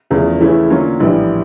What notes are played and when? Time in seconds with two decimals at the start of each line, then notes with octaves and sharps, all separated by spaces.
0.10 E2 C#3 F3 A3
0.41 C#3 E3 A3 C#4 E4
0.70 D3 F#3 A#3 C#4 F4
1.00 A#1 A2 E3 G3